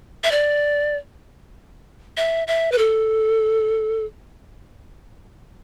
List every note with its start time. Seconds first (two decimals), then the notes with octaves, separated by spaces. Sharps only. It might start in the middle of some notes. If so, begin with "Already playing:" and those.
0.24 E5
0.32 D5
2.17 E5
2.48 E5
2.72 B4
2.78 A4